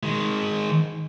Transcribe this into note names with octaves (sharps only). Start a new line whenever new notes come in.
D#3 G#3